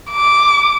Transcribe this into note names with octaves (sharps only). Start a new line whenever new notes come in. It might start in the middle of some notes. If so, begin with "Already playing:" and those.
D6